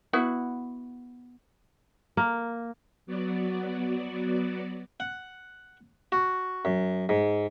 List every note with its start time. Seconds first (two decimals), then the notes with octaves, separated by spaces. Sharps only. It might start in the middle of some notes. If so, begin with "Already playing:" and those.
0.13 B3 E4 F#4
2.17 A#3
3.06 F#3 B3 F#4 D5
5.00 F#5
6.12 F#4
6.65 F#2
7.09 G#2